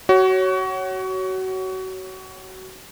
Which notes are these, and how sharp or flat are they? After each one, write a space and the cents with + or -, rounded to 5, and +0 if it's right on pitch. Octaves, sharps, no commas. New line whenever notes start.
F#4 +25 C#5 +0